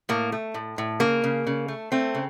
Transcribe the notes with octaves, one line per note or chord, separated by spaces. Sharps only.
A2 A#3
A3
A2
A2
C#3 A#3
C#3
C#3
A3
A3 C4
C#3